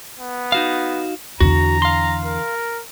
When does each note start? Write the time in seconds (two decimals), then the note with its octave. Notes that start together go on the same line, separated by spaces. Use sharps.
0.19 B3
0.52 D#4 F#4 F5
1.40 E2 D3 F#4 A#5
1.82 F5 C6
2.25 A#4